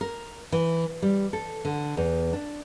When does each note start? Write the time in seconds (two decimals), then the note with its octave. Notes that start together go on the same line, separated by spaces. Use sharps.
0.01 A#4
0.52 E3
1.02 G3
1.33 A4
1.65 D3
1.97 E2
2.33 D4